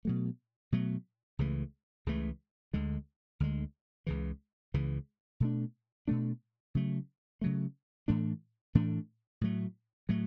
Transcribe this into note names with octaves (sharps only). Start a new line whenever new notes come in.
B2 F#3 A3
B2 F#3 A3
C#2 C#3 E3 A3
C#2 C#3 E3 A3
D2 D3 G#3
D2 D3 G#3
C#2 C#3 E3
C#2 C#3 E3
B2 A3 D4
B2 A3 D4
C#3 F#3 A3
C#3 F#3 A3
A2 E3 A3 D4
A2 E3 A3 D4
A2 F#3 A3
A2 F#3 A3